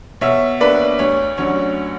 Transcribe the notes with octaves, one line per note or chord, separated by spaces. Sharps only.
B2 C#5 E5
A#3 D4 B4 D5
D2 C#5
D3 F#3 C#4 C#5